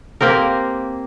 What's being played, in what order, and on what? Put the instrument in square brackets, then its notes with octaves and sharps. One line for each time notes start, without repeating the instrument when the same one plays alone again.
[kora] A#3 C4 G4 A#4